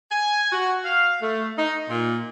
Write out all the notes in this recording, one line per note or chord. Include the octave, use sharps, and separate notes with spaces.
G#5
F#4
F5
A3
D#4
A#2